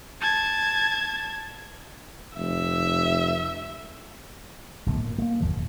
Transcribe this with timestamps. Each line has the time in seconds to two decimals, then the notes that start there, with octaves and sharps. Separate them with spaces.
0.21 A5 G#6
2.37 F1 E5
4.86 D1 B1 F#2
5.00 A#2
5.18 A3 A#3
5.40 G#1 E2 D#3 F#3
5.53 E1